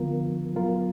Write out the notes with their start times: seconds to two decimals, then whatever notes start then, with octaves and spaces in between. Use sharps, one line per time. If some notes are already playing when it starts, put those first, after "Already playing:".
Already playing: D3 F3 B3 F4 A#4
0.54 F#3 B3 F4 A#4